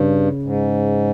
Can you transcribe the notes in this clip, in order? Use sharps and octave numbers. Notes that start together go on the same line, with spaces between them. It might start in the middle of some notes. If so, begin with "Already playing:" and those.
Already playing: G2 C#3
G#2